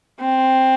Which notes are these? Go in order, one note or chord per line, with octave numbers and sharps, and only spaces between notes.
C4